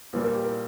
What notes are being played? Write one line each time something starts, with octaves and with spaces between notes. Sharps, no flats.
A#1 A#2 G3 A#3 B4
A#4
G4
A#4